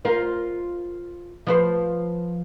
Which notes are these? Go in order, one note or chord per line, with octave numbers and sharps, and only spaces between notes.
F4 A#4 C5
F3 B4 C5